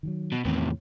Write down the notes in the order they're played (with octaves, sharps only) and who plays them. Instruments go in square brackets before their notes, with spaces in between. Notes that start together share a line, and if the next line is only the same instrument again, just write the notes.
[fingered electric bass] D#3 F3 F#3
[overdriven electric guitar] B2
[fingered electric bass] E2 D#3 E3 [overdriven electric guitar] A2 C3